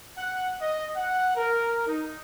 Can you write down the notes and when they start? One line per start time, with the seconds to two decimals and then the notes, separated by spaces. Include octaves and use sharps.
0.17 F#5
0.61 D#5
0.96 F#5
1.35 A#4
1.87 D#4